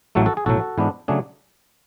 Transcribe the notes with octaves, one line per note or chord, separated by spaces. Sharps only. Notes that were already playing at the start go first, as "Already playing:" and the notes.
A1 A2 F#3 A3 F#4 A4
F#4 A4
G#4
B1 A2 F#3 F#4 A4
G#2 E3 B3 D4
C#3 F#3 A3 D4 G#4